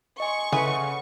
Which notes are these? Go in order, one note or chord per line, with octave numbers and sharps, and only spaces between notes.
D#5 G#5 C6 C#6
C#3 E4 G#4 A4 B4 F#5